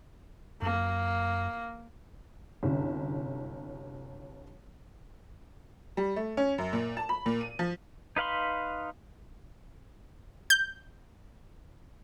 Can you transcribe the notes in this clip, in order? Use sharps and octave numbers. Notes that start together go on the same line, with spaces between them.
F#2 A#3
G1 C2 F#2
G3
A3
C#4
F#2
A#2
A5
B5
A#2
D#7
F3
D#4 B4 F5 B5 C6
G6